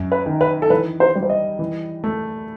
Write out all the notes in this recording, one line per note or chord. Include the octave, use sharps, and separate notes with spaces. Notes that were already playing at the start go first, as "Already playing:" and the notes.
Already playing: F#2
B4
D#3
B4
A4
E3 B4
C5
G3
C5
D#5
E3
A3